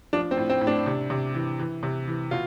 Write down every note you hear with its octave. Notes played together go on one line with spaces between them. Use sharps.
F3 D4
C4
A2
C4
A2
D4
C3
C3
E3
E3
C3
E3
B2 F4